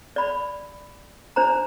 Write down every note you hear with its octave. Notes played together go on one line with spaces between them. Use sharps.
D5 B5
D4 C5 A#5